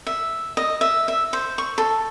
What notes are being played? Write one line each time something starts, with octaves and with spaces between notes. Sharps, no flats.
E5
D#5
E5
E5
C5
C#6
A4